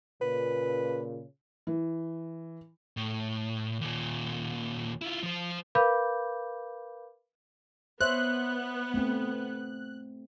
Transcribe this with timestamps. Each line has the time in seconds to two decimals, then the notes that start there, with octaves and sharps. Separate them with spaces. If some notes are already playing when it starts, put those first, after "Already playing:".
0.21 A#2 C#3 B4
1.67 E3
2.97 A2
3.81 D#2 A#2
5.02 E4 F4
5.23 F3 C5
5.75 A#4 B4 F5 B5 D6 G6
8.01 B3 C5 C#5 E5 F#6
8.94 A3 C4